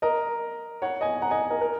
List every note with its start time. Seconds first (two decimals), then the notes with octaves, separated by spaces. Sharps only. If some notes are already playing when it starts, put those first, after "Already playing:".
0.02 A#4 D#5
0.82 C#5 F#5
1.01 D#5 G#5
1.22 F#5 A#5
1.31 D#5 G#5
1.50 A#4 D#5
1.61 A#4